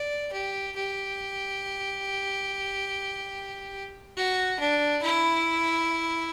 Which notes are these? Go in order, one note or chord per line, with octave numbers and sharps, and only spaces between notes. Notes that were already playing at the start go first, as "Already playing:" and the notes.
Already playing: D5
G4
G4
F#4
D4
E4